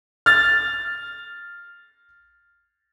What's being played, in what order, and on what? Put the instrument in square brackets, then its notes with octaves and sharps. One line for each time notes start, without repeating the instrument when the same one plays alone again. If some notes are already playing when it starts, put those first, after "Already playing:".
[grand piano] F6 A6